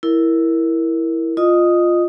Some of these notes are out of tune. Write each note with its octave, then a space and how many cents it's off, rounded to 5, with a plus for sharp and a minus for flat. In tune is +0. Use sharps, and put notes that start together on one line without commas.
E4 +0 A#4 +0
F4 +0 D#5 -15 D#6 +0